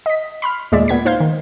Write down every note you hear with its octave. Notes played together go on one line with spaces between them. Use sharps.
D#5 B6
B5 C6 F6
D#2 A#2 G#3 D5 E5
A#2 B3 G#6 B6
D#4 C5 F5 G6 G#6
D#3